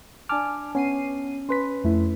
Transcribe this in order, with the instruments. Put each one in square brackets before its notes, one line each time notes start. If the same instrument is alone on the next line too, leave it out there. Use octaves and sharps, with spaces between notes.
[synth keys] D4 G#5 A5 [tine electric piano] D6 F6
[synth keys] B3 C7 D#7 [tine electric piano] C#4
[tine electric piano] C#4 B4 B6 [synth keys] C6
[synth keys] F2 A3 E4